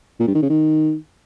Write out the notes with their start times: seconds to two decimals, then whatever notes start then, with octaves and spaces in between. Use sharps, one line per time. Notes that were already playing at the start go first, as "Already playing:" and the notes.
0.20 A#2
0.27 G2
0.35 D#3
0.42 C#3
0.49 D#3